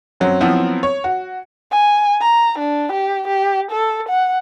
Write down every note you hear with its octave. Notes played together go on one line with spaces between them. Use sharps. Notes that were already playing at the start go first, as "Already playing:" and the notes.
F#2 F#3 C4
F3 F#3 B3 C4 E4
C#5
F#4
G#5
A#5
D4
G4
G4
A4
F#5